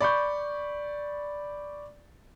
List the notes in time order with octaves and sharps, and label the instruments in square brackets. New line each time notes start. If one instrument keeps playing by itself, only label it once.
[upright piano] D5 B5 C#6 G6